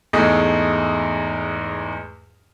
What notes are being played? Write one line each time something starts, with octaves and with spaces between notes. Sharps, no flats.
E2 G#2 G#3 A3